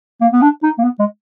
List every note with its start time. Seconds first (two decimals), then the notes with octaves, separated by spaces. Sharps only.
0.21 A#3
0.33 B3
0.42 D4
0.63 D#4
0.79 A#3
0.84 B3
1.00 G#3